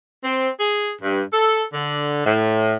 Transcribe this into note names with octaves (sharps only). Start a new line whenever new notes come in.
C4
G#4
G2
A4
D3
A2